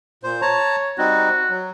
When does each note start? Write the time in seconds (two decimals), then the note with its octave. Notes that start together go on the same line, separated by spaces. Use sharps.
0.24 A#2 C5
0.42 C#5 A5 A#5
0.98 G3 C4 D#4 F#4
1.49 F#3